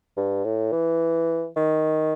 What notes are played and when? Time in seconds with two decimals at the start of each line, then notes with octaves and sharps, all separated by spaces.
0.17 G2
0.44 A2
0.72 E3
1.56 D#3